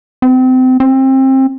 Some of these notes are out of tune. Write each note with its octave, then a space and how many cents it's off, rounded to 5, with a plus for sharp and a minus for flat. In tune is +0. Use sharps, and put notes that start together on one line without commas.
C4 -30
C4 +25